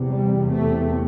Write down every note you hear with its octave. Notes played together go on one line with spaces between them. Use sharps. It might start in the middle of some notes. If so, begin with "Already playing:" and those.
Already playing: E2 C3
G3
A3